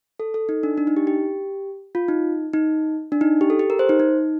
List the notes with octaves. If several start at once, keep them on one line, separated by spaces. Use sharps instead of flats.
A4
A4
D#4
D4
D4
D#4
G4
G4
F4
D#4
D#4
D4
D#4
G4
A4
G4
A#4
C5
D#4
D#4